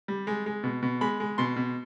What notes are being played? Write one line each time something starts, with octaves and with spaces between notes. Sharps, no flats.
G3
G#3
G#3
B2
B2
G#3 B5
G#3
B2 C6
B2